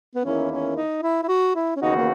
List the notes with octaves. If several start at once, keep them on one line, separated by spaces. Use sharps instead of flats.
B3
E2 D#3 A#3 C#4 E4
C#4
D#4
E4
E4
F#4
E4
C#4
D#2 C#3 E3 B3 D#4 F#4
A#3